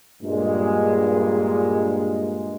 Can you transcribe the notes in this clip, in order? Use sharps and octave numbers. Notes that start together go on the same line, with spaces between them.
G2 A#2 G#3